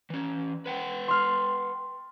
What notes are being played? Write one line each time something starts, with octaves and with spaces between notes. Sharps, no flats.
E3 C#4
B4 F#5 G5
C6 F6